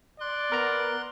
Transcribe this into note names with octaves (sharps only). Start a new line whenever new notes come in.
D5 C6 F#6
B3 A#4 A#5